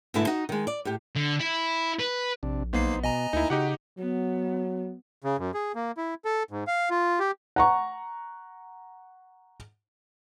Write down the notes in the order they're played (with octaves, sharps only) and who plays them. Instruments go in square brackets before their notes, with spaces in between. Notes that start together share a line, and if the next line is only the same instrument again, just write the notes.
[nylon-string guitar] G#2 B2 D3 A3 E4 A5
D#4 F#4
D#3 G#3
D5
A2 G4
[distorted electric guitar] D3
E4
B4
[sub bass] A#1 [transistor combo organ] C3 D4
[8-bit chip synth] B1 A#3 C7 [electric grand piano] B3 [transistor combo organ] D#4 C5
[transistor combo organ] B2 [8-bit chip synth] D#5 G#5 A#5
[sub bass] D2 [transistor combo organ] A#3 [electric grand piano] D#4 E4
[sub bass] C#3 [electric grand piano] D#4 G4 F#5 [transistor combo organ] F#4
[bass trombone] F#3 [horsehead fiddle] B3
[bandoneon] C#3
F#2
G#4
A#3
E4
A4
G#2
F5
F4
G4
[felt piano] F#5 A#5 C#6